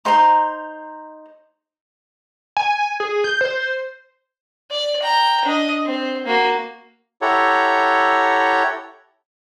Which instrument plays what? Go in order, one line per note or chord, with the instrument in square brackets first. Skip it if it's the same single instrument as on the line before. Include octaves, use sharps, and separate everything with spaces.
[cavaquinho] D#4 C5 A#5 C6
[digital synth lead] G#5
G#4
G6
C5
[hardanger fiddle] D5
G5 A#5
D4 D#5
C4
A#3 F#4
[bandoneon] E4 G4 A4 C#5 F#5 A#5